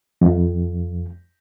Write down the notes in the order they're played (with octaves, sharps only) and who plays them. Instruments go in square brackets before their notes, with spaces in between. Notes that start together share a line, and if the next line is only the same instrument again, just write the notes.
[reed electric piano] F2